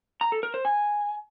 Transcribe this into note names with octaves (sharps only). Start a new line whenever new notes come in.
A#5
A4
A#4
C5
G#5